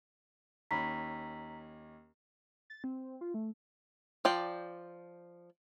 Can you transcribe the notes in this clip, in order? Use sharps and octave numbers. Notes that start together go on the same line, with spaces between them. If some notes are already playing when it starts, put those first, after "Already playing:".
D#2 C#4 A#5 B5 B6
A6
C4
F4
A3
F3 D5 G5